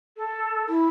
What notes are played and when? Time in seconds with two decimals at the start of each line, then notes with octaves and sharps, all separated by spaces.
0.16 A4
0.69 E4